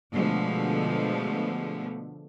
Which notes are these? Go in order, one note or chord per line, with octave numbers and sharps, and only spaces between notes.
B2 D3 F3 G#3 A3 B3